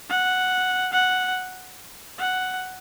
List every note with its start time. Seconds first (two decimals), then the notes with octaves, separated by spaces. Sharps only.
0.10 F#5
0.93 F#5
2.18 F#5